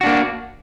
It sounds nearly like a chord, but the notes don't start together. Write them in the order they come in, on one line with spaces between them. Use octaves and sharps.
F#4 D4 A#3